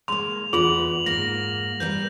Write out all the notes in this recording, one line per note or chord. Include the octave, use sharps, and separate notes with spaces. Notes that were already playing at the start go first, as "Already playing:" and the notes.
G#3 A#3 C6 F7
E2 B3 F4 G#4 F#7
G#2 A#3 A#6
G3 A#3 B4 G6